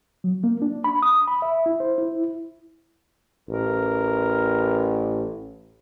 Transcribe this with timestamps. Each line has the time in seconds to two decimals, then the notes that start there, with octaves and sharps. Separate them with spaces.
0.24 F#3
0.44 A#3
0.62 D4
0.84 B5
1.02 D#6
1.28 B5
1.42 E5
1.66 E4
1.80 C5
1.98 E4
3.49 A1 A#4